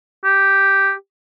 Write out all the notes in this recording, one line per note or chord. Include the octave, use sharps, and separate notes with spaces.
G4